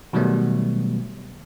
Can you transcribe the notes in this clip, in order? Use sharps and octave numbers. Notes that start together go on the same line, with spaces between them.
B2 D#3 F#3 G3 A3 B3